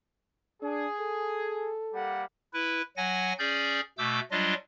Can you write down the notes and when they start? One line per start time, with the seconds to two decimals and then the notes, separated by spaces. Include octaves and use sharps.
0.63 D4 G#4
1.00 A4
1.94 G3 A#3 F#5
2.53 E4 B4
2.97 F#3 F#5 G#5 A#6
3.39 C#4 G#4 D5 G6
3.98 B2 A3 D6 E6 G6
4.31 F#3 G3 D4 F4 D#5